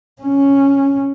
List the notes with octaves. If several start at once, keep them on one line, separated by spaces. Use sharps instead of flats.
C#4